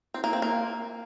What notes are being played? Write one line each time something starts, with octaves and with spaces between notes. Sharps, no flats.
C4
A#3
C4
A#3